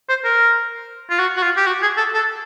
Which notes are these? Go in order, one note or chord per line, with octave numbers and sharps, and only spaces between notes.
C5
A#4
F4
F#4
F#4
F4
G4
F#4
G#4
A4
A4